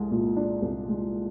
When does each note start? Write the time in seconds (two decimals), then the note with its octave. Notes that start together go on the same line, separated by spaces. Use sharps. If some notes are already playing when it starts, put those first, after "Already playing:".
Already playing: C2 G#3
0.11 A#2
0.36 D4
0.62 C2
0.89 G#3